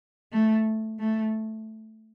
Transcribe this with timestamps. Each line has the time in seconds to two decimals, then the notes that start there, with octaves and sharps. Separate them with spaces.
0.33 A3
1.00 A3